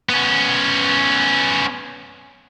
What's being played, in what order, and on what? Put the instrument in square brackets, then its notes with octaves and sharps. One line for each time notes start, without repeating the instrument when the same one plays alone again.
[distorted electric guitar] B3 C#4